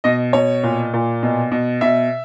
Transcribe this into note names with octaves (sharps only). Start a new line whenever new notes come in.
B2 D#5
B2 C#5
A#2
A#2
B2
B2
B2 E5